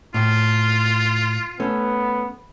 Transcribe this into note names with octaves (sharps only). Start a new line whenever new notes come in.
A2 F4
A3 B3 C#4